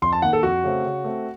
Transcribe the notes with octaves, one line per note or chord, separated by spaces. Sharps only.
F2 C6
A5
D#3 A#3 F#5
A4
F2 F#4
C#3 A3 C4
C#3
A3 C4